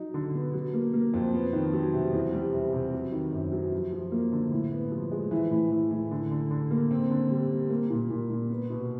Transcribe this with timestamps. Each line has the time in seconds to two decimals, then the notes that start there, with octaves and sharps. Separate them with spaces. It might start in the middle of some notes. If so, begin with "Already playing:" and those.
Already playing: F#3 D#4
0.14 D3
0.34 B3
0.54 F#3
0.73 A#3
0.93 A#3
1.14 F2
1.33 B3
1.53 D#3
1.73 F#3
1.93 C3
2.13 E2
2.33 G3
2.53 C3
2.73 C3
2.93 F#3
3.12 D#3
3.32 F#2
3.52 F#3
3.72 F3
3.92 F3
4.12 A#3
4.32 D3
4.51 A2
4.72 B3
4.92 F3
5.11 G#3
5.31 E3
5.51 A2
5.71 E3
5.91 A2
6.11 D3
6.31 D3
6.51 D3
6.71 A#3
6.91 C4
7.11 D3
7.30 G3
7.50 G3
7.70 A#3
7.90 A#2
8.10 A#2
8.30 A#2
8.50 B3
8.70 B2